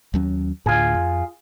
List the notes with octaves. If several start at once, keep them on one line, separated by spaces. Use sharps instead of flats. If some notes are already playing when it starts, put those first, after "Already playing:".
D#2 F#3 C#4
D2 A2 F4 G#4
F2